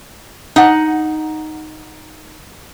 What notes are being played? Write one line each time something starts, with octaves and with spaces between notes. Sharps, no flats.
D#4 F#5